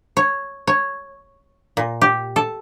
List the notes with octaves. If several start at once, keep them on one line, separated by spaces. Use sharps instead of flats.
C#5
C#5
A#2
G4
A4